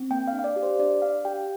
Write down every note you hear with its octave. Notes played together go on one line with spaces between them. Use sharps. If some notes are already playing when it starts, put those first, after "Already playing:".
Already playing: C4
A#3 G5
F5
D4
F5
D5
G4
C5
D4 D5
D4 F5
G4 G5